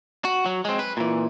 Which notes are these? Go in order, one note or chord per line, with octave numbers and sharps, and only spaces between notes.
F#4
F#3
G#3 C4
B4
A#2 E3